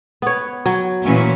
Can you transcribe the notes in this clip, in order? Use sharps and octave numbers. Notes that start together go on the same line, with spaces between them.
B3 C#5
F#3
A#2 E3 C#4